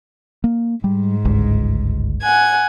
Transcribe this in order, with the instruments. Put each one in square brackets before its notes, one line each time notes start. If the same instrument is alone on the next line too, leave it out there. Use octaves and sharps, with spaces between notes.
[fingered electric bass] A#3
[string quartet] G#2 [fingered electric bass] G3
[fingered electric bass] G1 C#2
[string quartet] F#5 G#5 G#6